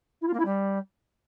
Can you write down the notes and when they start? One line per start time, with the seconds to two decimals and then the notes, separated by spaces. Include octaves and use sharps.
0.21 E4
0.27 F4
0.33 A#3
0.39 E4
0.45 G3